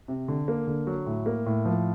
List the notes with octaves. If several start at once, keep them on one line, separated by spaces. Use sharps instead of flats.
C3
D3
A#3
D3
F#3
A2
A#3
A2
F3